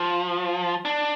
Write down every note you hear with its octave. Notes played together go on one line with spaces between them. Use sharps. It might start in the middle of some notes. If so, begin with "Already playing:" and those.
Already playing: F3
D4